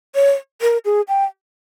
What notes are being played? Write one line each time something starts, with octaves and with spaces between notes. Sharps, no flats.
C#5
A#4
G#4
G5